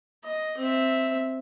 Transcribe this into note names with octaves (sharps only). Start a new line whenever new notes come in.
D#5
C4 E5